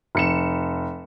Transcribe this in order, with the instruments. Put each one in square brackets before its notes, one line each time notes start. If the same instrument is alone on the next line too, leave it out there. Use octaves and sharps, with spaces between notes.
[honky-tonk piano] F1 C#7 E7